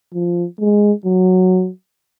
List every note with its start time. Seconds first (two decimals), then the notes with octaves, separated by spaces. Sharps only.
0.14 F3
0.60 G#3
1.06 F#3